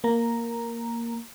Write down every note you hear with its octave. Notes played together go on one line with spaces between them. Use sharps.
A#3 A#5